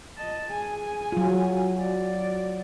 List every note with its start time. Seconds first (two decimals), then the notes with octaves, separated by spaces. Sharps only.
0.17 D#5 A5
0.47 G#4 G#5
1.12 F#3 F4
1.80 D5